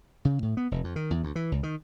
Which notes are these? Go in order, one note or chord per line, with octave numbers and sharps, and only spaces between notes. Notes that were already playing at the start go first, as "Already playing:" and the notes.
C#3
A2
B3
F1
F2
D#3
E2
D2
E3
C#2
D#3